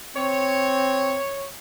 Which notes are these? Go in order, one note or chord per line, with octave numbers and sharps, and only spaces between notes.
C4 C#5